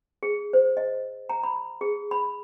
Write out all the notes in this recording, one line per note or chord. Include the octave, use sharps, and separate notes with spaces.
G#4
C5
D#5
A#5
B5
G#4
B5